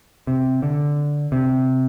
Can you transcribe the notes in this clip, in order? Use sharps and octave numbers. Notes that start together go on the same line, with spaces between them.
C3
D3
C3